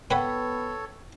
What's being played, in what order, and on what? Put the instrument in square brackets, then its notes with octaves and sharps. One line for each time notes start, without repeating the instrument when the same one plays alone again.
[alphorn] B3 [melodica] A4 C#5 [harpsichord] B4 F#5 B5 [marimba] G5